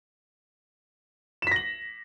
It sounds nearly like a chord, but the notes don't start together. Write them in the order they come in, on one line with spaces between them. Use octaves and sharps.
E7 B6 A#6 F#7